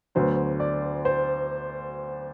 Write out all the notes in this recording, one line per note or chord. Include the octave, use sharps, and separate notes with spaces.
D2 D3 F#3 B3 C5
D5
C5